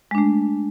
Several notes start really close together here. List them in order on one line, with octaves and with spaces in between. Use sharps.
G#3 D4 A3